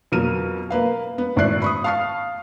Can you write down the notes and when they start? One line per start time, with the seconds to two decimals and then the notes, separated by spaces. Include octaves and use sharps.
0.12 F2 B2 F#3 A#3 F6 D#7
0.70 A#3 B4 F5
1.18 B3
1.36 G#1 A2 D5 E5 F#6 C7
1.62 B5 C#6 D#6
1.84 F5 A5 C#6 F6 C7